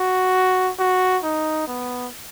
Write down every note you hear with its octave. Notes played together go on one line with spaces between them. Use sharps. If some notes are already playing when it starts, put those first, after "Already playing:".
Already playing: F#4
F#4
D#4
B3